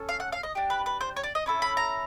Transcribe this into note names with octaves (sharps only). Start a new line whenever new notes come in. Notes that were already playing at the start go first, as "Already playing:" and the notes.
Already playing: C#4 A4
F5
F#5
F5
D#5
D4 G4
B4
B4
C5
C#5
D5
D#5
C#4 E4 A4
B5
A#5